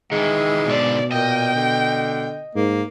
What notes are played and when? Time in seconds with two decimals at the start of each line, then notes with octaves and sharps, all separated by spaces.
0.12 D#3 E3 G#3
0.67 G#2 B2 D3 D5
1.12 A#2 D#5 G5
1.55 D3
2.55 G#2 A#3